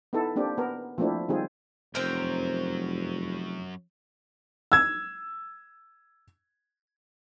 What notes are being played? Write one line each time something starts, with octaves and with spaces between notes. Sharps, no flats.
B3 D#4 E4 A4
A#3 C4 D4 G4
B3 A#4
F3 A3 A#3 C4 D4 E4
D#3 G3 G#3 C4 F4 G#4
F1 F#2 F#3 C4 A#4
E6 G#6